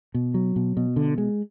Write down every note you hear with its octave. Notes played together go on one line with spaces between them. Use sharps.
B2
F#3
B2
B2
D3
G#3